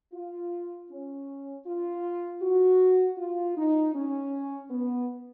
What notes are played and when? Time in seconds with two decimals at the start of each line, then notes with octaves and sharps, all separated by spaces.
0.13 F4
0.90 C#4
1.66 F4
2.41 F#4
3.18 F4
3.56 D#4
3.94 C#4
4.71 B3